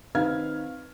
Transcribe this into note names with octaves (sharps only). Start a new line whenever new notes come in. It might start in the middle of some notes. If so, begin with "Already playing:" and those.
D#3 C4 B4 F5 F6 G#6